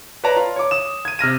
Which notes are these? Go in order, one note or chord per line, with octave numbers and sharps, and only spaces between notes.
B4 C#5 D5 A5 A#5
F4
C#5 D6
D#6 E7
G#6 D#7
C3 F6 A#6 D#7